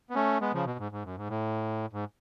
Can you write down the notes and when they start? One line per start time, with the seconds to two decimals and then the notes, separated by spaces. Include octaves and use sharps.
0.10 B3
0.15 A3 C#4
0.41 G#3 B3
0.53 C#3 F3
0.66 B2
0.79 G#2
0.92 G#2
1.04 F#2
1.17 G#2
1.29 A2
1.93 G#2